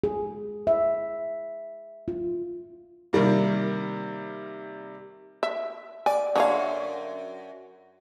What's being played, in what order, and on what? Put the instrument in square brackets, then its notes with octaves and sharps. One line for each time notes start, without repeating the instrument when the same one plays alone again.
[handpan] G#4
E5
F4
[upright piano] C3 D#3 G3 A#3
[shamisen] E5
[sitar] D5 [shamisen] G#5
[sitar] F#2 C#5 [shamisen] D3 G#4 F5